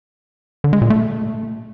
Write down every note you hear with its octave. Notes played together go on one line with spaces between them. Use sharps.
D3
G#3
A#2
A3